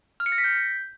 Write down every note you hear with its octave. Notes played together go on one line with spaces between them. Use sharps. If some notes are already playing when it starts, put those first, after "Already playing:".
F6
C#7
A#6
B6
G6